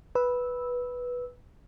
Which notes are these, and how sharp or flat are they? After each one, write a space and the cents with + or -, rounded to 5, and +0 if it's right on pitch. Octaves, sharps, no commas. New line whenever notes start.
B4 -5 E6 -10